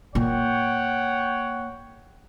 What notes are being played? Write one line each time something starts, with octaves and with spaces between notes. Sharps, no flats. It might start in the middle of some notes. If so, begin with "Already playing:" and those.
A#2 C#5 F#5 G5